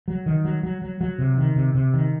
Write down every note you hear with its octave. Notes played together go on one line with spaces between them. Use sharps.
F#3
D#3
F#3
F#3
F#3
F#3
C3
D#3
C3
C3
D#3